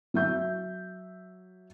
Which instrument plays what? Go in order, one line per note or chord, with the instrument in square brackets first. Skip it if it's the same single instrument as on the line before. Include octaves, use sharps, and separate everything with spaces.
[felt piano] F#3 E5 G6